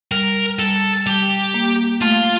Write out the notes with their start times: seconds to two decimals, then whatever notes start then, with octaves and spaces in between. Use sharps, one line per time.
0.11 G3 A#4
0.59 G3 A4
1.06 G3 G4
1.54 A#3
2.01 A3 F4